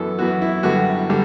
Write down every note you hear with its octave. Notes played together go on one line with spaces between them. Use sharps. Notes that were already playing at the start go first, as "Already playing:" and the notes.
Already playing: F#2 E3 B3 A4
F#2 E3 B3 F#4
E4
F#2 D3 G3 B3 F#4
D3 G3